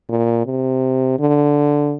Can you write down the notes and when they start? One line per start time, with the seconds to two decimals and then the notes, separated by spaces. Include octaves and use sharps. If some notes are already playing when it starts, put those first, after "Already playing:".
0.09 A#2
0.46 C3
1.20 D3